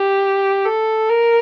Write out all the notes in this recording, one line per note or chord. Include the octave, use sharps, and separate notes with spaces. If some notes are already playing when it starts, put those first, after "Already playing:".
Already playing: G4
A4
A#4